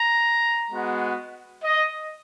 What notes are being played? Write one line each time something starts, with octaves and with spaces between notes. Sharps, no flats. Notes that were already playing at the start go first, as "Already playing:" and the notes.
Already playing: A#5
G#3 B3 F#4
D#5